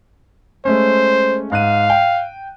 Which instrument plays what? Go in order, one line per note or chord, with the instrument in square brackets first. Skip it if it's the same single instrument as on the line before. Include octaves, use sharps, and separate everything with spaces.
[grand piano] G#3 A3 C#4 [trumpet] C5
[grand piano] G#2 F#6 D#7 [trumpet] F5
[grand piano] G5